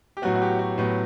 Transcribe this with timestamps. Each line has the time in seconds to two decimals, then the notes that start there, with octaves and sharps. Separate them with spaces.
0.17 G4
0.22 A2 F#3 B3 F#4
0.36 F#4
0.42 G4
0.59 F#4
0.78 A2 F#3 B3